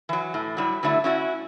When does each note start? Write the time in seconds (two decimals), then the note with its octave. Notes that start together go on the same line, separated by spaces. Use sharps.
0.09 E3 F#3
0.34 A2
0.57 F#3 G3 E4
0.83 D3 F#3 A3 E4
1.04 C#4 E4 F#4